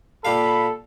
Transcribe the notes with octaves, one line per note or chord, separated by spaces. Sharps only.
A#2 G4 A4 F5 B5